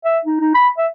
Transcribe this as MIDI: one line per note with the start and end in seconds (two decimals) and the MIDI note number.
0.05 0.19 76
0.25 0.39 63
0.40 0.52 63
0.55 0.69 83
0.78 0.87 76